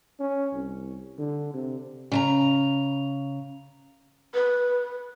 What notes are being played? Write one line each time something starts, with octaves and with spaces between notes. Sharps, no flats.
C#4
C2
D3
C3
C#3 A5 A#5
B4